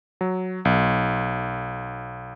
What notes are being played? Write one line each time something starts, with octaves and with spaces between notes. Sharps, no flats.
F#3
B1